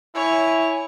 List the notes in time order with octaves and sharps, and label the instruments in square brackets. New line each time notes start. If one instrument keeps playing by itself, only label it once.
[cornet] E4 [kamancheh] C#5 [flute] G#5